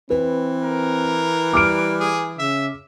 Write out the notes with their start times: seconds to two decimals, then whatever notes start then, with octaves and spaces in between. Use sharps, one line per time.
0.10 E3 C4 B4
0.63 A#4
1.53 G3 D6 F6 D7
2.00 G#4
2.39 C#3 E5